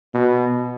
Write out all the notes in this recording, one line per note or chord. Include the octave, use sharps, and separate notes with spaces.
B2